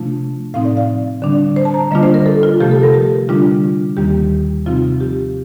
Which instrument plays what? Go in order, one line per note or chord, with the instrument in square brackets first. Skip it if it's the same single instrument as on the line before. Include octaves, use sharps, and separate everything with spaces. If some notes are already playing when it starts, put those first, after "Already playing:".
Already playing: [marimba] C3 F3 A3 D4 F4
A2 F3 C4 D#4 F5
D5
F5
D3 G3 D4
C5
A5
A#5
D3 G3 A#3 D4 F4 D#5
C5
A#4
A4
F4
C3 F3 A3 G4
A4
A#4
G4
D3 G3 D4 F4
D#2 D#3 G3 A#3 G4
C3 F3 C4 D#4 F4
G4